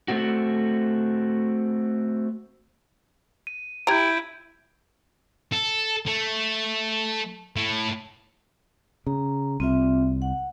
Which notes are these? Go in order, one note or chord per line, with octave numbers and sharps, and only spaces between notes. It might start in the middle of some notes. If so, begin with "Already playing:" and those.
A3 C4 F#4
D#7
E4 G4 A#5 G6 G#6 D7
A4
A3
A2 A3
C#3 A#5
C2 C4 F4 E5
F#5